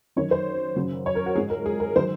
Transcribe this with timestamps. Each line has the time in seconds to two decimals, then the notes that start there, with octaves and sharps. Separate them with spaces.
0.16 F#2 D#3 F#3 C#5
0.31 C5
0.76 F#2 C#3 F#3
1.06 C#5
1.15 A#4
1.26 F#4
1.35 G#2 F3 G#4
1.50 A#4
1.66 G#4
1.80 A#4
1.96 D#3 F#3 C5